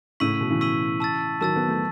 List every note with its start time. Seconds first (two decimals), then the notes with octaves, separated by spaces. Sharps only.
0.20 A2 C#3 C#6 E6 B6 D#7 F#7
0.41 B2
0.50 C#3 E3
0.61 C#6 E6 B6 D#7 F#7
1.00 A5 E6 A6
1.41 D#3 F#3 A5 E6 A6
1.56 B3
1.68 A3